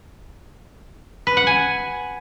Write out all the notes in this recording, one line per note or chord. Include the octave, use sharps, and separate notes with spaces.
B4
F#5
G#5